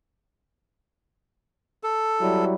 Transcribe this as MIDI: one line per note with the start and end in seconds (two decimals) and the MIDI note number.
1.83 2.45 69
2.21 2.55 54
2.21 2.55 55
2.21 2.55 64